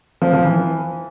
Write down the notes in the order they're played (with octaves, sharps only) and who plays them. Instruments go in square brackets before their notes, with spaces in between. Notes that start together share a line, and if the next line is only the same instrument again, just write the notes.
[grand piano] F3
F3
E3